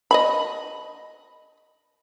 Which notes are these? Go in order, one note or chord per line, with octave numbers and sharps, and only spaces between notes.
D#5 E5 B5